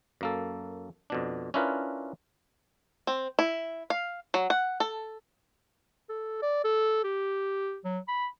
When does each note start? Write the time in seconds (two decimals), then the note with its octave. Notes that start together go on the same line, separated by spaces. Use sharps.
0.21 F#2 A#3 A4
1.10 F2 B2 D4
1.54 C#4 D4 E4 F4 A#4 B4
3.07 C4
3.39 E4
3.90 F5
4.34 F#3
4.50 F#5
4.80 A4
6.09 A4
6.42 D5
6.64 A4
7.04 G4
7.85 F#3
8.08 B5